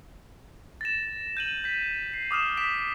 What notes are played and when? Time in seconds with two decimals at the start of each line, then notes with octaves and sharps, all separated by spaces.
0.81 A6 A#6 E7
1.37 G6 D#7 F#7
1.64 G6 B6
2.14 C7
2.31 D6 D#6 F6 E7
2.57 D6 D#6 B6 D7 E7